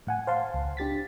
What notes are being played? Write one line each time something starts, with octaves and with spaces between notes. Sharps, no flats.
A2 F#5 G#5
C5 F5 F#5 A5 C6
C#2
D4 G4 A6 B6